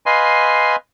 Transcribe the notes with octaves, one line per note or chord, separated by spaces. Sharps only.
B4 D#5 F5 G#5 C6